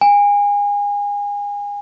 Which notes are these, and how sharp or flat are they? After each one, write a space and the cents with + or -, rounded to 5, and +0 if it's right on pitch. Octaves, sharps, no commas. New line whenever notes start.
G#5 -30